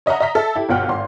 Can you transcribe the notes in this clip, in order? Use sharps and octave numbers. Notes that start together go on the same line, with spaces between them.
C#5 D#5 E5 F#5 A#5
D#5 E5 A#5 B6
A4 E5 A5
E4 G4
G1 B2 F4 F#5 G5 F6
G#1 C6